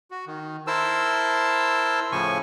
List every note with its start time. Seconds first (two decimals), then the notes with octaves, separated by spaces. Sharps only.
0.11 F#4
0.27 D#3
0.67 E4 A#4 C5 A5 E6
2.12 A2 C#3 F3 G#5 C#6